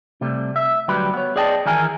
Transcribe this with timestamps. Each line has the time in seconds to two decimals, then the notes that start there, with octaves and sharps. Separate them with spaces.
0.21 C3 G3 A3
0.56 E5
0.88 D2 F#3 G3 G4 B4 B5
1.14 B3 C#5
1.36 G#4 D5 D#5 G5 A5
1.66 D#3 E3 E4 G#4 A#4 G#5